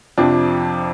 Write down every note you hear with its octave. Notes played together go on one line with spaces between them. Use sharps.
F2 C3 F3 D4